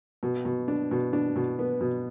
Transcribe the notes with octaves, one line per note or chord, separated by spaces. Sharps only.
B2
B2
D4
B2
D4
B2
B3
B2